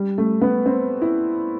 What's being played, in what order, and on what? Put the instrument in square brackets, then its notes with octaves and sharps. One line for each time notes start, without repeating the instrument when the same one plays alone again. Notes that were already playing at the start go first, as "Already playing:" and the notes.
Already playing: [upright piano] G3
A3
B3
C4
E4